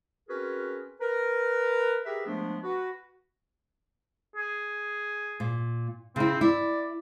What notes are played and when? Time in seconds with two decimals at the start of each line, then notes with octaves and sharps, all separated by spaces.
0.29 C4 C#4 F#4 G#4 A#4 B4
1.01 A#4 B4
2.06 G4 G#4 A#4 B4 E5
2.27 F3 G#3 A3 B3 D4
2.63 F#4 B4
4.36 G#4
5.40 A#2
6.16 C#3 C4 E4
6.41 E4 D5